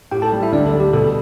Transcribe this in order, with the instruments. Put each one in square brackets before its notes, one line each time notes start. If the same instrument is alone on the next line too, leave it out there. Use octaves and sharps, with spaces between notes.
[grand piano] A2 [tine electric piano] G4 G5
[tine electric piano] A4 A5
[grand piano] G3
[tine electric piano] E4 E5
[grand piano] D2 [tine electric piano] D4 D5
[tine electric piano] A4
[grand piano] G3
[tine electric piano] G4
[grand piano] B2 [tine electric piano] A4